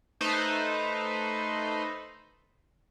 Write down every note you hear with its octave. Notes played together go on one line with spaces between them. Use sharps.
A3 D#4 B4 C5